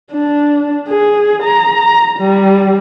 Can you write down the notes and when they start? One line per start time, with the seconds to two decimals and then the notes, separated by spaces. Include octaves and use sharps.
0.13 D4
0.89 G#4
1.43 A#5
2.19 G3